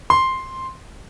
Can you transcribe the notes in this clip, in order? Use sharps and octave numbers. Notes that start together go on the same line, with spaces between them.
C6